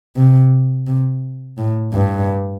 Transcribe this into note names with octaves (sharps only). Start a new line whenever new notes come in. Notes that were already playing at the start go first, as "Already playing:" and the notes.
C3
C3
A2
G2